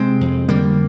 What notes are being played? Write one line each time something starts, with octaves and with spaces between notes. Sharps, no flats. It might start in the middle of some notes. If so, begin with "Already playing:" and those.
Already playing: C3 G#3 C4
F2
D3 G3 A#3